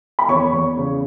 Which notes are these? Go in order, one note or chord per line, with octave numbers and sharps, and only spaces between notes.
B5
E2 C#5 C#6
E2
C#3